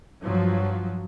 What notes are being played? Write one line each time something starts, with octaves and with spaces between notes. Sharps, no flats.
G2 F3 F#3